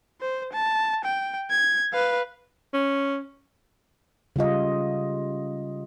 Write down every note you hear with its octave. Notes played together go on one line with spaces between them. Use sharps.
C5
A5
G5
G#6
B4 F5
C#4
C#3 G3 F4 D#5